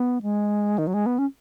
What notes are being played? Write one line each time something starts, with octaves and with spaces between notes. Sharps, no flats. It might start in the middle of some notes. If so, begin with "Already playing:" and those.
Already playing: B3
G#3
D#3
F#3
G#3
B3
C#4